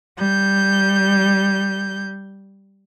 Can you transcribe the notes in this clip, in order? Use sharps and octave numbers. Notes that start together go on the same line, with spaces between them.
G3 G6